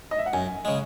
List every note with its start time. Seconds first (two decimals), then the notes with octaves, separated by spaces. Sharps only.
0.11 D#5
0.18 E5
0.26 F#5
0.33 F#2 G#5
0.65 C#3 G#3